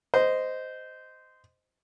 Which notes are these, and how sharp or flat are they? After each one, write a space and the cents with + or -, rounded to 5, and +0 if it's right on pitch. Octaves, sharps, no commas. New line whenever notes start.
C5 -15 D#5 +0